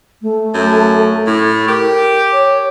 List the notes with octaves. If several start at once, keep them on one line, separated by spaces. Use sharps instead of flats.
A3
F#2
A2
G4 A#4
C#5